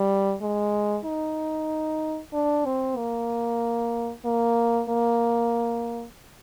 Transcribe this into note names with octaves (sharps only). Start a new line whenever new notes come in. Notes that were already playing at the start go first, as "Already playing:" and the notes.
Already playing: G3
G#3
D#4
D4
C4
A#3
A#3
A#3